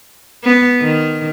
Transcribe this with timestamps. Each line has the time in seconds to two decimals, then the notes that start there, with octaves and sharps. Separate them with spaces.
0.44 B3
0.82 D#3